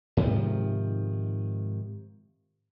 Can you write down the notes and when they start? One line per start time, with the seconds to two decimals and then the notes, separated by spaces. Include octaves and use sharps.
0.17 G#2 C3 D#3 F3